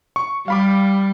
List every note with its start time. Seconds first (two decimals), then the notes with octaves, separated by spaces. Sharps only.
0.16 C#6
0.48 G3 F5 B5 D6